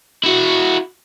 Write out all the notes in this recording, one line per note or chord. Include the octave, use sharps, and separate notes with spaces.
E4 F#4